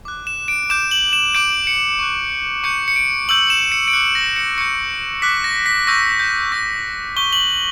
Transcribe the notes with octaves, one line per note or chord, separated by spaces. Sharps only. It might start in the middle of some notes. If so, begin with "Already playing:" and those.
D6 F#6
E7
D7
D6 G6 E7
F#7
E7
D6 G6 D7
C#7
C#6 F#6
C#6 G6 C#7
C#7
D7
C#6 E6 G6 F#7
E7
C#7
D7
D6 F#6 C#7
A#6
C#7
C#6 G6 C#7
D6 F#6 B6
A#6
B6
C#6 E6 G6 A#6
G6
C#6 E6 G6 A#6
C#6 G6 G7
F#7